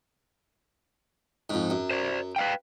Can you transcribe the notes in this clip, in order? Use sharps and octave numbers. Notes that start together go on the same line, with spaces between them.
F2 G#2
F#2
C5 D5
B4 F5 G5